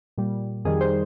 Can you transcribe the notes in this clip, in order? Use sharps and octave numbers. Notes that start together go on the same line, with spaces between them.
A#2 G3
F2 D#3 G3 G#4
C5